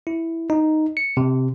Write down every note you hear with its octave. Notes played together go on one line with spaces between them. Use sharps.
E4
D#4
C#7
C3